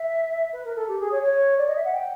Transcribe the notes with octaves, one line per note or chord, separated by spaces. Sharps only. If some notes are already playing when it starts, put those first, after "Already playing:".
Already playing: E5
B4
A#4
A4
G4
G#4
C#5
C#5
D5
D#5
E5
F#5
G5